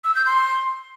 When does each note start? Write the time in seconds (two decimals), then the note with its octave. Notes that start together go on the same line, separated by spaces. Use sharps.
0.04 E6
0.15 G6
0.26 C6